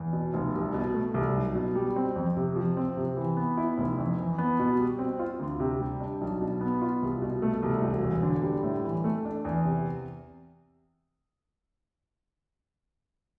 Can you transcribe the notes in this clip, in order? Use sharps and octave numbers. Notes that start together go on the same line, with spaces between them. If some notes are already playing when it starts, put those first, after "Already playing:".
Already playing: E2
B2
F1
C2
B2
A3
C2
B1
B2
G3
C4
F2
C3
F3
C4
C3
E3
B3
E4
F1
F2
E3
B3
B2
G3
C4
F4
D2
C3
G3
D4
B1
B2
B3
F4
C2
B2
A3
C2
E1
E2
D3
G3
A2
E3
A3
D4
E2
C3